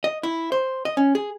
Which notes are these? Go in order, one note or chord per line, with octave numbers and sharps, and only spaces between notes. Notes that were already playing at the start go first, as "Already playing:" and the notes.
D#5
E4
C5
D#5
C#4
G#4